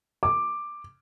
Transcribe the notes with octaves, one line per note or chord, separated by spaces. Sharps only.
D6